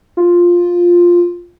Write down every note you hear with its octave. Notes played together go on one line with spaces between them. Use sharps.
F4